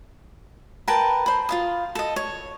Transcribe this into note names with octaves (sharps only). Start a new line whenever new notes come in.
A#4 B4 G5 A5
C5 B5
F4 F5 D#6
A4 D#5
C#5